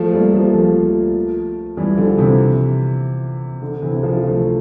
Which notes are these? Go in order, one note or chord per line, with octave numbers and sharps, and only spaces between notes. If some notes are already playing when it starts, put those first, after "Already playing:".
Already playing: F3 A3
G3 A#3
F3 A3
F3 A3
E3 G3
D3 F3
C3 E3
D3
C3 E3
D3 F3
F3 A3